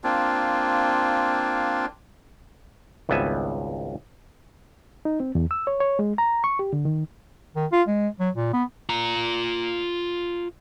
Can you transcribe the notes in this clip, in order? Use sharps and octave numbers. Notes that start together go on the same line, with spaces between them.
A#3 C4 D4 F4
G#1 C#2 G3 B3 E5 G#5
D#4
C4
E2
E6
C#5
C#5
G#3
A#5
C#6
G4
D3
D#3
D#3
F4
G#3
F#3
A#2
B3
F4 A#5